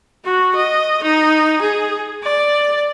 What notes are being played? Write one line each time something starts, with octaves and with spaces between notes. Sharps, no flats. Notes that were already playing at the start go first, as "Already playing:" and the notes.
F#4
D#5
D#4
G#4
D5